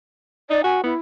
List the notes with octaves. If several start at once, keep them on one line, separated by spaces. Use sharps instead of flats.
D#4 D5
F#4 G#5
B3 E4